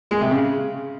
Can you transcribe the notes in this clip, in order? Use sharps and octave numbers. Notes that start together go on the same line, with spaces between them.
G#3
C3
C#3